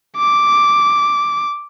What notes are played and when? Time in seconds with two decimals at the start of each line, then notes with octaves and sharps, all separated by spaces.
0.17 D6